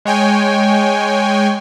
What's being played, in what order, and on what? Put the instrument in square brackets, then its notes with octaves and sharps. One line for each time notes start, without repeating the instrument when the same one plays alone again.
[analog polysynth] G#3 C#5 G5 G#5